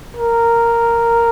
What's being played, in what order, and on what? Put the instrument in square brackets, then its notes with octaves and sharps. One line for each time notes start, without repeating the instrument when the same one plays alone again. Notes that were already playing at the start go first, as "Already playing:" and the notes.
[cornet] A#4